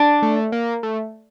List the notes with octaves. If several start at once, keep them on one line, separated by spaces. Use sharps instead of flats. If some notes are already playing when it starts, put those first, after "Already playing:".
Already playing: D4
A3
A#3
A3